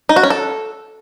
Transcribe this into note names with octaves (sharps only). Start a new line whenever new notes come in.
D#4
F#4
C#4
A4